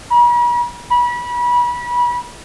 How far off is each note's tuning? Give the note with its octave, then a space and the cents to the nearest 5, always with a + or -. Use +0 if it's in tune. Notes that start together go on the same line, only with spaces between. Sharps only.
B5 -45
B5 -30